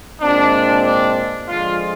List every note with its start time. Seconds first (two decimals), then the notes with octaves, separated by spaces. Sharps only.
0.21 A#2 G#3 C4 D4
0.85 D4
1.49 D3 F3 G#3 F4